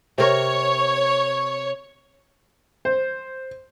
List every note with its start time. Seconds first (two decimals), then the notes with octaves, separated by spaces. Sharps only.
0.18 C3 A#4 C#5
2.85 C5